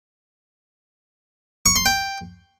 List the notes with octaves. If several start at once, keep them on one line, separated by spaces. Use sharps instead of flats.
C#6
C6
G5